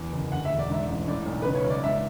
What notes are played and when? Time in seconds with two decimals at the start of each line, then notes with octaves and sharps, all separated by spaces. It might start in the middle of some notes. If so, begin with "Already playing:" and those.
Already playing: E2
0.13 F#1
0.31 D2 F#5
0.45 E5
0.50 E1
0.59 D5
0.70 G#2 E5
0.89 A1
1.08 A2 D5
1.26 B1
1.42 C#3 B4
1.55 C#5
1.64 C#2
1.70 D5
1.84 G#2 E5